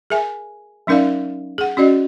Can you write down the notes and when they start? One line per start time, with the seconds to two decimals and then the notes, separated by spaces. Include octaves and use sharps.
0.10 G#4 A#4 E5 G#5
0.87 F#3 C#4 D#4 A#4 D5 F5
1.58 G#4 F#5
1.77 C#4 F#4 D5 D#5